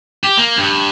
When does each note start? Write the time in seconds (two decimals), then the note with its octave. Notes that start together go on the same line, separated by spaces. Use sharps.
0.24 G4
0.37 A#3
0.57 G2